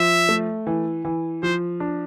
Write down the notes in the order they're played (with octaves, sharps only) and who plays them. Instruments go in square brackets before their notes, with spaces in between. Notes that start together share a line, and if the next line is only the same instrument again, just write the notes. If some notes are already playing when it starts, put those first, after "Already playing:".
Already playing: [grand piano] F3 [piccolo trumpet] E5
[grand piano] A3
E3
E3
[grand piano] F3 [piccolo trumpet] C5
[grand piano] D4